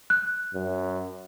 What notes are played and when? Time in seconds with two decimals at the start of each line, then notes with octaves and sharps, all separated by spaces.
0.10 F#6
0.54 F#2